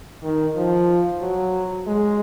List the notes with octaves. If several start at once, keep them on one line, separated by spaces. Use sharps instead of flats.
D#3
F3
F#3
G#3